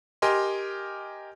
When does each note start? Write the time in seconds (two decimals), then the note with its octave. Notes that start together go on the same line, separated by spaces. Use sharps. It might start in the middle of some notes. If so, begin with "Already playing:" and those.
0.22 G4 A#4 D#5 G#5 C6